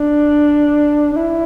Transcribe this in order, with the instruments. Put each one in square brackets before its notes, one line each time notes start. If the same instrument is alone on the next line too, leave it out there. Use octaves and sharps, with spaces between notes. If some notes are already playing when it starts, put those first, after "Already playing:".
Already playing: [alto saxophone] D4
D4
E4